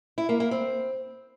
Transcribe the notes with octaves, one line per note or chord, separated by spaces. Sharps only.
E4
A#3
A#3
C4